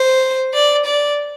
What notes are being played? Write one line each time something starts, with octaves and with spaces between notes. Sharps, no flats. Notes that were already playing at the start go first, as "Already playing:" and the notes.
Already playing: C5
D5
D5